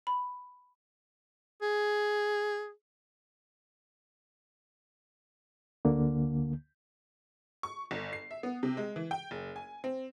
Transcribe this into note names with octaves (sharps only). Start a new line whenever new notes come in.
B5
G#4
D2 D3 A#3
C#6
G1
C7
E5
B3
C3
G#3
E3
G5
F#1
G#5
C4